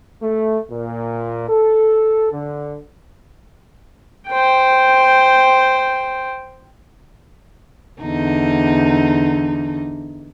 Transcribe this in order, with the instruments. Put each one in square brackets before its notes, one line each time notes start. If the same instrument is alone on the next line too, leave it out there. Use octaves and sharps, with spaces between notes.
[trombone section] A3
A#2
A4
D3
[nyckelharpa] C5 G5
[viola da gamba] E2 D3 D#4